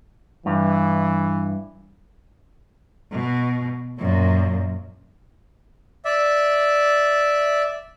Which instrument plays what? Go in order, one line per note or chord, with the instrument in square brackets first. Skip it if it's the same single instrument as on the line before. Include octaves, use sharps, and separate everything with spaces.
[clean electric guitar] G2 [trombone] E3
[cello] B2
F#2 A#2
[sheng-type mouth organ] D5 E5